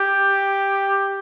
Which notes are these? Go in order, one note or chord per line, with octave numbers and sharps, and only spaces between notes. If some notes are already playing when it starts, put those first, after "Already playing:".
Already playing: G4